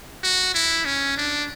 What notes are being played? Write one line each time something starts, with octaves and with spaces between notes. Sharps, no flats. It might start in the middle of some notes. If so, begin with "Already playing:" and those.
F#4
E4
C#4
D4